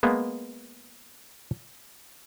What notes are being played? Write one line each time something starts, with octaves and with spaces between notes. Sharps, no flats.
G#3 A#3 B3